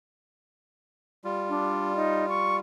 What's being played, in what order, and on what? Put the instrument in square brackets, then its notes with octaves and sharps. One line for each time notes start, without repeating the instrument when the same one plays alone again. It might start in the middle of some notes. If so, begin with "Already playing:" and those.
[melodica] G3 F4
[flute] D4
D#4
C#6